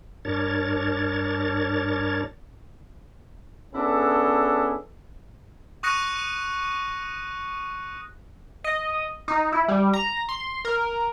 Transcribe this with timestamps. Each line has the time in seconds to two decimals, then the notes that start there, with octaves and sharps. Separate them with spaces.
0.25 G2 D4 A#4 C#5 A6
3.74 B3 C#4 D4 E4 G#4 A4
5.83 C#6 D#6 F#6 A#6 C#7 D#7
8.64 D#5
9.28 D#4
9.52 E4
9.68 G3
9.93 A#5
10.29 C6
10.65 A#4